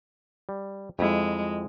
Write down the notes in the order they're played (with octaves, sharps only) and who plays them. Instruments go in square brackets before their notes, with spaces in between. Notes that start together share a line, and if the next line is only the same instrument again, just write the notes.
[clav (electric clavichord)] G3
[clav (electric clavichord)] F2 E4 [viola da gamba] G#3